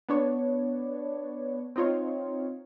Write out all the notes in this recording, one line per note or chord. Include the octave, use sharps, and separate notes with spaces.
B3 D4 C#5
C4 D#4 F4 C#5